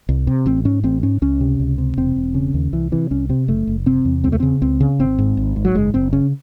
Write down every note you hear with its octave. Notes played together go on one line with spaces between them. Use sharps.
C2
C3
A1 C4
G#2 C#4
A1 C4
G#2 C#4
C#2 C#4
C3
C#2
C3
E1 C4
E1
C#3
D#2
C2 E3
C3 E3
C2 C#4
C3 C4
F#1 A3
F#1
C3 C4
E2
C#2 C4
A3
C#3 C4
C#2 C4
C#3
G#1 C4
G#2
G#1
G#2
F#3
F#1 G#3
F#1 C4
C#3 C#4